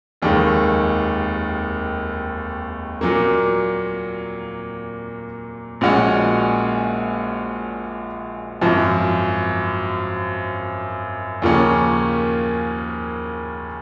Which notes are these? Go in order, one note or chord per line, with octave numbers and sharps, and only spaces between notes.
F1 D#2 D#3 G#3
A#2 F#3 A#3
A#1 A#2 G#3 C#4 F#4
G#1 F#2 F3
D#2 C#3 F3 A#3 C#4